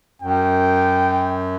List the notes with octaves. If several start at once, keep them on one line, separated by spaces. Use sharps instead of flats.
F#2 G5